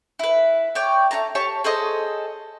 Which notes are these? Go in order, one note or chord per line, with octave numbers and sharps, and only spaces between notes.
E4 B4
C#5 D5 G5
A3 F4 A5 A#5
G4 C#5 A5 C#6
G#4 A4 C5 D#5